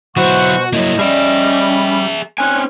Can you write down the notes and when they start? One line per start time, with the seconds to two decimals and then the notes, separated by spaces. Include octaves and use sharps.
0.17 B2 F#3 E4 F#4 C5 F#5 C#6
0.73 F#3 A#3 E4 D#5
0.99 G3 C#4 G#4 E5
2.38 C4 C#4 G#5 F#6